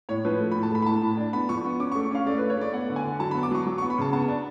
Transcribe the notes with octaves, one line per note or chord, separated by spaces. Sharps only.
A2 C#5
F3 B4
A3
A2 B5
A5
A3 B5
B5
A2 A5
A2
D4
B3 B5
F3 C#6
B3
C#4 D6
C#6
A3
C#6
C#4 F5
A3 D5
A3 B4
C#5
A3 D5
B3 F#5
D3
G#5
D3
F#3 A5
B3 B5
D6
F#3 C#6
F#3 C#6
B3 C#6
B5
C#3 A5
B3 A5
D4